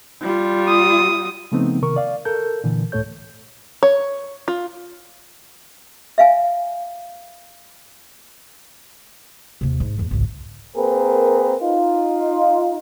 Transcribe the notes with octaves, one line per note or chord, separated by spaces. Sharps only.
G3 F4
D#6
C#3 F3 A3 B3 C4 D#4
C3 D#3 A#4 C#6
D5 F5
A4 A#4 G6
A#2 D3 E3
C#2 A2 A3 A4 C#5 G6
C#5
F4
E5 F5 G#5
D#2 C3
G#2
E2 B3
G#1 C#2
A#3 C4 G#4 A#4 B4
D#4 F4